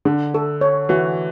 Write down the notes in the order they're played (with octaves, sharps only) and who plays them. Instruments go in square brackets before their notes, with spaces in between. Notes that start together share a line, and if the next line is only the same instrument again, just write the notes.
[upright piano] D3 [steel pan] D4
[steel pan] A4
C#5
[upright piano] E3 [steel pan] F#4